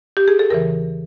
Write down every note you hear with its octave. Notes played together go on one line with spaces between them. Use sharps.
G4
G#4
A4
E2 C#3 E3 A#4